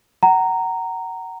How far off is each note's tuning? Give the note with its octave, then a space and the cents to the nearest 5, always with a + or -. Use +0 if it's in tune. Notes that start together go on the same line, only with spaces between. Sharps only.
F#5 +30 A#5 -10